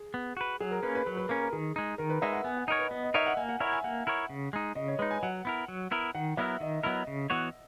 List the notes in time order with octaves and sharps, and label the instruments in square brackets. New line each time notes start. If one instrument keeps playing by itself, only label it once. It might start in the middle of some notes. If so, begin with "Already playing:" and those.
Already playing: [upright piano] G#4
[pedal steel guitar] B3
F#4 B4
[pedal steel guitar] F#3 [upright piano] G#4
[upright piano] A#4
[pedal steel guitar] A#3 C#4 [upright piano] B4
[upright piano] B4
[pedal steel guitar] F#3 [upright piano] B4
[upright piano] B4
[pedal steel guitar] A#3 C#4 [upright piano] A#4
[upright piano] A#4
[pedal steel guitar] D#3 [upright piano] G#4
[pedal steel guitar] G#3 D#4
[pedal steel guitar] D#3 [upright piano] A#4
[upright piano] B4
[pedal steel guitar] G#3 D#4 [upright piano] E5
[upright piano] F#5
[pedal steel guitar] B3 [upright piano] G#5
[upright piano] F#5
[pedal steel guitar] D#4 A#4 C#5 [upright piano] D#5
[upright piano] B4
[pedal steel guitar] B3 [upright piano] D#5
[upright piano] D#5
[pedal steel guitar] D#4 A#4 C#5 [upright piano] E5
[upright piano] F#5
[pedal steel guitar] A#3 [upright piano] G#5
[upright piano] F#5
[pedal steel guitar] E4 A#4 C#5 [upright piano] E5
[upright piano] G#5
[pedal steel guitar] A#3 [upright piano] F#5
[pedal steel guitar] E4 A#4 C#5
C#3
G#3 D#4
[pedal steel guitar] C#3 [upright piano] D#5
[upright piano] C#5
[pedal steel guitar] G#3 D#4 [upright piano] B4
[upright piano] G#5
[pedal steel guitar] F#3 [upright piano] F#5
[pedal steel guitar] B3 E4 A#4
F#3
B3 E4 A#4
[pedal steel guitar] D#3 [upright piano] F#5
[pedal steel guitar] F#3 B3 E4 A#4 [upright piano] E5
[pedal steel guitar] D#3 [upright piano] D#5
[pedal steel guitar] F#3 B3 E4 A#4
C#3
E3 B3 F#4 C#5